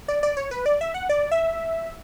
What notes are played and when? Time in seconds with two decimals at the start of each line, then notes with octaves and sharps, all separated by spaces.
0.08 D5
0.23 D5
0.37 C#5
0.51 B4
0.66 D5
0.81 E5
0.94 F#5
1.09 D5
1.31 E5